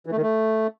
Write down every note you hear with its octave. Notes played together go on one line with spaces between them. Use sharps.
E3
A3
D#3
A3